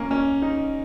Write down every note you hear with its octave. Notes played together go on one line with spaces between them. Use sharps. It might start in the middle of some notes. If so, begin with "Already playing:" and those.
Already playing: A#3 C#4
C#4
D#4